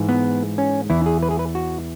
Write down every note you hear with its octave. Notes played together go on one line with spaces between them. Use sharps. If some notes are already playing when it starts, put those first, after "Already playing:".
Already playing: G#2 E3
B3
C#4
E2 E3 E4
G#4
B4
G#4
B4
F#4